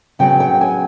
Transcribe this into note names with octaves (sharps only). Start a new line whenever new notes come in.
C#3 F#3 B3 G5
G5
G#5